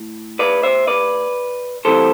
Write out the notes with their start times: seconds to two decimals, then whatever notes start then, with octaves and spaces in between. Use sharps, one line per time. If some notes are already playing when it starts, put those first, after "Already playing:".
Already playing: A2
0.39 B4 D5
0.63 C5 E5
0.87 B4 D5
1.85 A2 E3 G3 C4 A4 C5